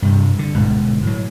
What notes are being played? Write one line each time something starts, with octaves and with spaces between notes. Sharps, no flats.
G2 C3
D3
D1 G#2 B2
A2 F#3